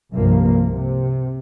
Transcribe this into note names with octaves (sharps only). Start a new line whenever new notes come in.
C2 G2 C3 F3 A#3
C3